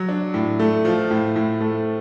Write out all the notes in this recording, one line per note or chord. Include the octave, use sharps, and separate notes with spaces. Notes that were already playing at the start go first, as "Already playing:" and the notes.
Already playing: F#3
D4
A2
A3
F3
A2
A2
A3